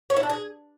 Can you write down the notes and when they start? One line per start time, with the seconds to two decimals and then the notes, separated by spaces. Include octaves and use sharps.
0.10 C#5
0.17 E4
0.23 D4
0.30 G#4